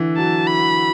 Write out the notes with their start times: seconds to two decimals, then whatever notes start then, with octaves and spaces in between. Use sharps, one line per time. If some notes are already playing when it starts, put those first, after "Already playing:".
Already playing: D3 E3
0.17 F#3 A5
0.47 B5